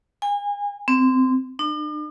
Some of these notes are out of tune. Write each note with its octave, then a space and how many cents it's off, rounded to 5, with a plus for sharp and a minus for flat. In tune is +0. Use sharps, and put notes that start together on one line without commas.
G#5 -35
C4 -20
D4 +45